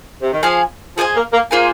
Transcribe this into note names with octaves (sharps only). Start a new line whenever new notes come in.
C3
D#3
F3 G#4 F5 G#5
F3 G#4 C5 D#5 G#5
A#3
A#3
A#3 F4 G#4 C5 G#5